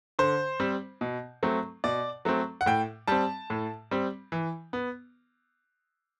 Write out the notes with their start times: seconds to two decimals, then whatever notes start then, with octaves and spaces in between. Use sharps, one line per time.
0.19 D3 C5
0.60 G3 C4
1.01 B2
1.43 F#3 A3 C4
1.84 B2 D5
2.25 F#3 A3 C4
2.61 F#5
2.66 A2 G5
3.08 G3 C4 A5
3.50 A2
3.91 G3 C4
4.32 E3
4.73 B3